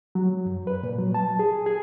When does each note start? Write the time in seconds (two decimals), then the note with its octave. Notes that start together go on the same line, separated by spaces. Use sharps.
0.15 F#3
0.46 F#2
0.67 B4
0.83 A#2
0.99 F#3
1.14 A5
1.39 G#4
1.66 G#4